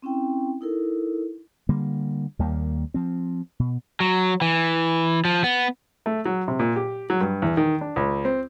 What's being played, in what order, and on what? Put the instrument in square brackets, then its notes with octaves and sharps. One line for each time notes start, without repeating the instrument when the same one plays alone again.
[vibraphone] C4 C#4 E4 G5
D#4 E4 A4 A#4
[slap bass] D3 G3 A#3
D#2 D#3 G3 A#3
F3 C4
B2
[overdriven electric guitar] F#3
E3
F3
B3
[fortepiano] A3
F#3
C3
A#2
G4
F#3
G2
E2
D#3
D4
C#2
C4